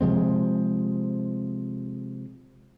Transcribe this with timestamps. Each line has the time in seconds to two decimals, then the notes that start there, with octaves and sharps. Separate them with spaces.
0.01 C3 F3 G#3 C4